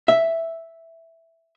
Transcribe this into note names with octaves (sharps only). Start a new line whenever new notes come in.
E5